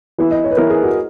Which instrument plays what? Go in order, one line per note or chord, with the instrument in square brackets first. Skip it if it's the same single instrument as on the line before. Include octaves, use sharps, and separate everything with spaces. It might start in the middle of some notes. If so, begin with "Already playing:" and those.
[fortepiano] E3 B3 E4
[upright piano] D#5
C#5
B4
[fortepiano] E3 B3 E4 [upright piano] A#4
[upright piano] G#4
F#4